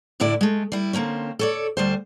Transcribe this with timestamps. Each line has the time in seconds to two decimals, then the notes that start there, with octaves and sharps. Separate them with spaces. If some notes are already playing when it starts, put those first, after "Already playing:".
0.20 D2 A2 D3 E4 D5
0.41 G#3 A3
0.72 G3 E4
0.93 D3 A#3 C4 C#4
1.39 A4 C#5 D5
1.77 D2 G3 C5